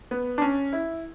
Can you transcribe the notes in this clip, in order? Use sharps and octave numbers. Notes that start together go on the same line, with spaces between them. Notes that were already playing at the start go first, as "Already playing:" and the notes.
B3
D4
C#4
E4